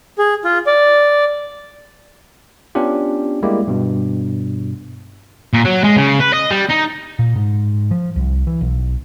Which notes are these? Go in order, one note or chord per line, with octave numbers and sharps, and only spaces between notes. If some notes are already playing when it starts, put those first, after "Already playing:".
G#4
F4
D5
B3 C#4 D4 F4 G4
G3 G#3 A#3 E4 G4
G2 B2
A#2
F#3
G#3
C#3
B4
D#5
G3
D#4
A#2
G#2
F3
C2
E3
B1